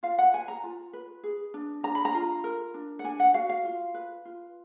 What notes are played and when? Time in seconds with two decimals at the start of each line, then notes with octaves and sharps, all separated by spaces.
0.03 F4 F5
0.18 F#5
0.33 B4 G#5
0.48 A#5
0.64 F4
0.93 B4
1.23 G#4
1.54 D4
1.83 D4 A#5
1.95 B5
2.05 A#5
2.14 F4
2.44 A#4
2.74 D4
2.99 F#5
3.04 D4 G#5
3.20 F#5
3.34 F#4 F5
3.49 F5
3.65 F4
3.94 B4
4.25 F4